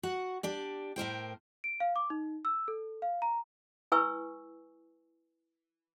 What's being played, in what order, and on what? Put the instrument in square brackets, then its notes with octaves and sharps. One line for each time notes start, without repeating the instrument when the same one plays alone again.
[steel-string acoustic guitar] F#4 F#5
D4 G4 D5
A2 A#4 C5 G5
[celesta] D7
F5
D6
D#4
E6
A4
F5
A#5
[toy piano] E4 B4 G#5 C#6 E6